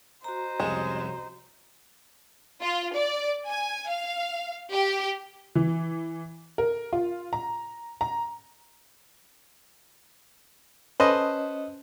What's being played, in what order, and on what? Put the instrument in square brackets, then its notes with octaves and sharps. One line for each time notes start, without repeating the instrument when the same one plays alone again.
[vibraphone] F#4 A#5 [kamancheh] C5 D#5
[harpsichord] C2 F2 C#3 [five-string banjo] G#3
[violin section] F4
D5
G#5
F5
G4
[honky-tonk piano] E3
A#4
F4
A#5
A#5
[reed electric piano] C#4 D#5 [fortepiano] A4 B4 C5